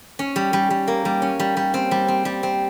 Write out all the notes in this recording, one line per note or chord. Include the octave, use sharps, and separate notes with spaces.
C#4
G3
G3
G3
A#3
G3
C#4
G3
G3
C4
G3
C4
G3
C4